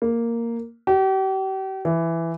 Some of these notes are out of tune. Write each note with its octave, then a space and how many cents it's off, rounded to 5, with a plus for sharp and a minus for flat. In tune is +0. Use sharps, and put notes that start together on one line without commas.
A#3 -5
G4 -40
E3 +10